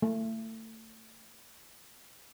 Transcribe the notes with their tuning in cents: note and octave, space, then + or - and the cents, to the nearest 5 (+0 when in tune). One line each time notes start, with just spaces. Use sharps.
A3 +30